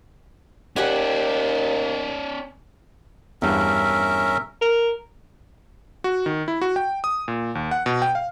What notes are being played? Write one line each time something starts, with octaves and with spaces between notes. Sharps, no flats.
D#2 C#4 G4 D5 F#5 G#5
E2 G2 C#4 A#4 E5
A#4
F#4
D#3
E4
F#4
G5
D#6
A#2
D#2
F#5
B2
G5
F5